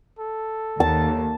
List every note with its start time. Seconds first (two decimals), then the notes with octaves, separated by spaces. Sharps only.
0.19 A4
0.80 D#2 A5